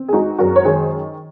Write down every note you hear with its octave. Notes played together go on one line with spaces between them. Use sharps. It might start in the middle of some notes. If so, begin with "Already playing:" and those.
Already playing: C4
G#4
G#3 D#4 F#4
F#2 F#4 A#4
C#5
D#3 G#4 C5